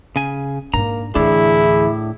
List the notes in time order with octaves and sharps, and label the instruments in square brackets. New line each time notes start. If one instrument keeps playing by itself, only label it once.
[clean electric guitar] C#3 G#5
[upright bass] G#2 D4 [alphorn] A#3 [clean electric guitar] A#5
[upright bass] D2 E3 [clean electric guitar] A2 D4 [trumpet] E4 [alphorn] G#4